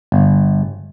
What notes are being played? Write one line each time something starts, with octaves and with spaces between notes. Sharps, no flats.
G1